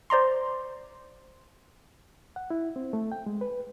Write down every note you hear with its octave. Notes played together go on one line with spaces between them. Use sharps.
C5 D5 A#5 C6
F#5
E4
C4
A3
G5
G#3
B4